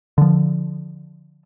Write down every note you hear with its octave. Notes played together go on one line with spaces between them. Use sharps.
D3 F3